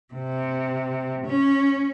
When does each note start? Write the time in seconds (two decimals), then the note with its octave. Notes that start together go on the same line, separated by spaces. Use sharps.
0.14 C3
1.26 C#4